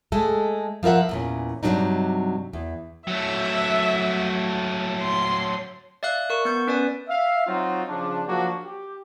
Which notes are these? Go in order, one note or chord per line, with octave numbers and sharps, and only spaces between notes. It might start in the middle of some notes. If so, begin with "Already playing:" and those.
G#3 A3 A4
F3 F4 A#4 E5 F#5
E2 A#2 C#4
G2 C3 F3 F#3 D4 D#4
E2
F#3 A3 E5
C6
D5 E5 F5 F#6
A#4 C#6
B3 G6
C#4 B4 D5 G#5
E5 F5
F#3 C4 D#4 F4 F#4
C#3 F3 D4
F3 F#3 A#3 D4 F#4
G4